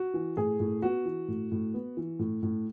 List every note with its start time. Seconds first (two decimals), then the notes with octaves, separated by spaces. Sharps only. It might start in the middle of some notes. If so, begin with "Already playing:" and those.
Already playing: F#4
0.14 E3
0.37 A2 G#4
0.60 A2
0.82 B3 F#4
1.05 E3
1.28 A2
1.52 A2
1.74 B3
1.97 E3
2.19 A2
2.43 A2